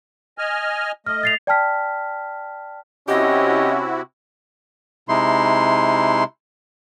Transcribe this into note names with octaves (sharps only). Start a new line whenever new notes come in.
D#5 G#5 F6
A3 D#5 F6
A6 C7 F7
D5 G5 A5 F6 B6
C3 C#4 E4 F#4 G4 D#5
C3 G#3 D#4 E4 C6